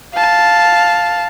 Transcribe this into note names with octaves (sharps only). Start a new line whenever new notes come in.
F5 A5